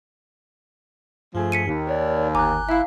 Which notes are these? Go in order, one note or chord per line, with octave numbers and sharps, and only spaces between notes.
G2 F3 A3 G#4
B6 C#7 D#7
D#2
A#4 C#5 D5
G1 G#5 A#5 D6 F#6
E4 E5 F5